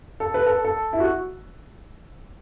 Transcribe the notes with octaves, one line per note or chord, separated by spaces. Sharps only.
A4
B4
A4
A4
E4
F#4